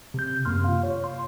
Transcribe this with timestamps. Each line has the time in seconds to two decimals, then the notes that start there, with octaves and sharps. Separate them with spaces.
0.14 C3 G6
0.45 F#2 C3 A#3 C6 F6
0.64 F4 F5
0.83 C#5
1.04 C6